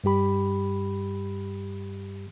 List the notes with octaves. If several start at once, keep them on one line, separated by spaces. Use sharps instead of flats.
G2 G3 G4 B5